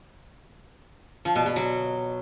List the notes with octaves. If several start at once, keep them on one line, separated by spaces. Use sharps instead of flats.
F3
B2
B2
F#3